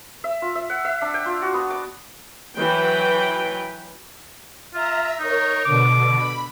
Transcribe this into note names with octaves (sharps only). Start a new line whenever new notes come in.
E5
F4
E5
F#5
E5
D4
G5
F4
F#4
B3
D6
E3 F#3 B4 G5
F4 E5 A#5
D#4 A#4 C#5
B2 D3 D6
B5